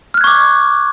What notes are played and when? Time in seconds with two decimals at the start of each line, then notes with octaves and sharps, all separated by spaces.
0.14 F6
0.18 F#6
0.21 G#6
0.24 C#6
0.27 D6